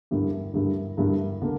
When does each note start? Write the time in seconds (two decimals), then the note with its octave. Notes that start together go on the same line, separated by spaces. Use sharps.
0.11 G2 D3 A#3 E4 G4
0.54 G2 D3 A#3 E4 G4
0.97 G2 D3 A#3 E4 G4
1.42 D3 A#3